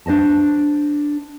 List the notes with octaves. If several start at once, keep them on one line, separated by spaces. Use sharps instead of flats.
D4 C5 D#5 A5